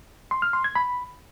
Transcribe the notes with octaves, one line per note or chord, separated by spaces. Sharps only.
C6
F6
C6
G#6
B5